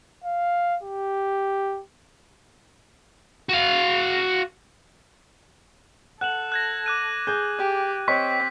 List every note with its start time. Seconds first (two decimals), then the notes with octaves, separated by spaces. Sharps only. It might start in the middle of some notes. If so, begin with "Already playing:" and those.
0.24 F5
0.83 G4
3.49 F#4 F5
6.21 A4 F#5 F#6 E7 F#7
6.52 F#6 G#6 A#6
6.86 D6 F#6 D#7
7.27 G#4 G6 A#6
7.59 G4
8.08 C4 C#5 D#5 C#6 B6